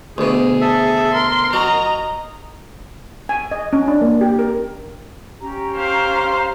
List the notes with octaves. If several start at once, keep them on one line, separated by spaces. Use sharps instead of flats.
D2 B2 G#4
A4 E5
A#4 C6
F#3 D#5 A#5
G#5
D#5
C#4
D4
A#3
G4
A#4
C#4 G4 A#5
C5 F5